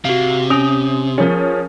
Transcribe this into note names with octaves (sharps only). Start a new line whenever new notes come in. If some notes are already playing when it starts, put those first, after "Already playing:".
C3 F#4 F5
C#4 D#6 F7
F3 C#4 G#4 A#4